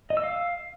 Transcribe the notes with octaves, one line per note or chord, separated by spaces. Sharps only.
D#5
E6
F5